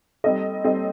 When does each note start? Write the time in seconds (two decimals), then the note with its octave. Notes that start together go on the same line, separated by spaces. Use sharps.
0.24 G3 C4 D#4 A4 D#5
0.64 G3 C4 D#4 A4 D#5